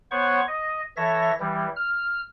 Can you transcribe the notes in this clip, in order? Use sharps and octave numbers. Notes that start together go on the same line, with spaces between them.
B3 C5 C#5 F#5 C#6
D#5
E3 A4 C#5 E5 A#6
E3 G3
F6